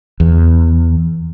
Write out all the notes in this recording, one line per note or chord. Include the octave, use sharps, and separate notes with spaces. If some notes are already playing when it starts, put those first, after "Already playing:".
E2